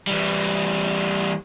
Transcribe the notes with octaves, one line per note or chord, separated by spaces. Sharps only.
E3 G3